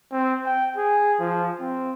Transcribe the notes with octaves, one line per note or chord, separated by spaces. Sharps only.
C4
G5
G#4
F3
C4